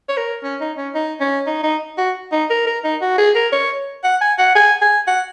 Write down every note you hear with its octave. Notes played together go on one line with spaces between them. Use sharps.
C#5
A#4
C#4
D#4
C#4
D#4
C#4
D#4
D#4
F#4
D#4
A#4
A#4
D#4
F#4
G#4
A#4
C#5
F#5
G#5
F#5
G#5
G#5
F#5